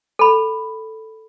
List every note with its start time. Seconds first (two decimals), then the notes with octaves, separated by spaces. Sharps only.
0.19 A4 B5